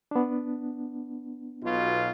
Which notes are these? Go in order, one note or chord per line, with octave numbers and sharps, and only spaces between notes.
B3 D4
B1 B2 F4